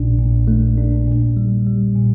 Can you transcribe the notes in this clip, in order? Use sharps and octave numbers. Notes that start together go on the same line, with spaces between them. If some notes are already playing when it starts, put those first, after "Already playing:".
Already playing: A#1 A#2 D4
A#2
A3
D4
A#2
G3
G3
A#2